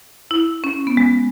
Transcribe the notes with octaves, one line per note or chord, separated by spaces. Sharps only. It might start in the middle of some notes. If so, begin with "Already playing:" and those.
E4
C#4
B3
G#3